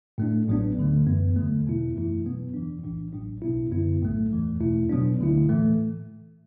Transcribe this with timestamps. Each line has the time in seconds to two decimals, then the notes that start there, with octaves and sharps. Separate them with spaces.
0.18 A2 A3 D4
0.48 A1 A2 F#3 B3 D4
0.77 D2 D3 A3
1.07 F#2 E3 B3
1.36 E2 D3 F#3 A3
1.66 E2 B2 B3 E4
1.95 F#2 E3 A3 E4
2.24 B2 F#3 B3
2.54 E2 E3 D4
2.84 B1 A2 E3 D4
3.13 A1 A2 F#3 D4
3.42 B1 B2 B3 E4
3.72 F#2 D3 B3 E4
4.01 B1 A2 F#3 A3
4.31 E2 E3 A3
4.60 E2 B2 A3 E4
4.89 B2 F#3 B3 D4
5.19 D2 D3 A3 E4
5.49 A2 E3 A3